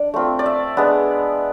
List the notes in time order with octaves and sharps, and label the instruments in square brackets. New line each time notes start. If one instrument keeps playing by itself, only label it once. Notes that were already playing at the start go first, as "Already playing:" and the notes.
Already playing: [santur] D4 D5
A3 C4 F4
D5
E5
G#3 B3 D4